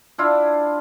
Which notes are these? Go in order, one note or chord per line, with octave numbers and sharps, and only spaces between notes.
D4 E4 F4